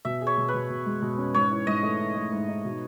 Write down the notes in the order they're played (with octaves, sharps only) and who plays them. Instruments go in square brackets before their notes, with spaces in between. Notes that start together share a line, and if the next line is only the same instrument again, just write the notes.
[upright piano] B2 [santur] E5
[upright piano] G#4
[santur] C#5
[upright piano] B2
[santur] B4
[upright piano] B2
B2
G#3
B2
C#4
[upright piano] G#2 [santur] C#5
[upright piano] E3
[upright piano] G#2 [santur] D#5
[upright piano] A3
D#4
A3
G#2
D#4
B2